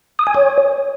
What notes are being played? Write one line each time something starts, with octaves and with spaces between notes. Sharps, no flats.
D#6
G#5
C#5